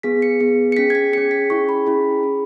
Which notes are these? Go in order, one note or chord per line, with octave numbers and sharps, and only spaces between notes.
B3 G#4 B6
C#7
B3 G#4
C#7
C#4 G#4 B6
G#6
B6
C#4 G#4 C#7
B6
C#4 E4 G#4 C#6
B5
C#4 E4 G#4
C#4 G#4